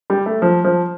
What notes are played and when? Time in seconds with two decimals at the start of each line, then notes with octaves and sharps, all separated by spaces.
0.10 G3
0.26 A3
0.42 F3
0.65 F3